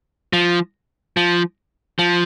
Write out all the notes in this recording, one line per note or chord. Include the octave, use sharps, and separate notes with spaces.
F3
F3
F3